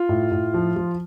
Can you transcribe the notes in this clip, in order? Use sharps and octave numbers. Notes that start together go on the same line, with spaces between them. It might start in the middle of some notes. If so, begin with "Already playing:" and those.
Already playing: F4
A2
A2
F3
F3